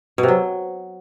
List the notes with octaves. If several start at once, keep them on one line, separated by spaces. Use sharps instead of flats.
B2
C3
F#3